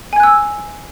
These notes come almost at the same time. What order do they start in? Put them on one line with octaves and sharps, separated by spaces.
G#5 G#6 F#6 E6